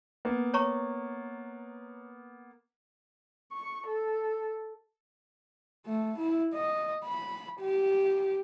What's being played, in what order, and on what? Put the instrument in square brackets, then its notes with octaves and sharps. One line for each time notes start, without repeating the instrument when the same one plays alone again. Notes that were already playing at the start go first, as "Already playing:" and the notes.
[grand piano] A#3 B3
[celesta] C#5 A#5 C#6
[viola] C#6
A4
[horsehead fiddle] A3
E4
D#5
B5
G4